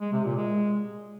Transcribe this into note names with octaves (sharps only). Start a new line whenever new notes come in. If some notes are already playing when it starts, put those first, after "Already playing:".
G#3
C3
A#2
G#3